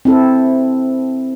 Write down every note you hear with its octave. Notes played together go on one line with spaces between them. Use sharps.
C4 E4 A4